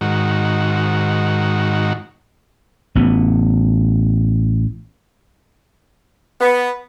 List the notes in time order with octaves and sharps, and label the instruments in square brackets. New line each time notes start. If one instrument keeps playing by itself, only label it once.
[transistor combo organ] G#2 D#3 F#4
[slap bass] A1 B3
[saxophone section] B3